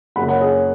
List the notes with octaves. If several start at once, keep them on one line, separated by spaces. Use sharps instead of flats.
F#1 F#2 C#3 F#5 B5
C#5 F#5
G#4 C#5